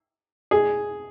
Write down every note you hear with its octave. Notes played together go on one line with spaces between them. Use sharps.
G#4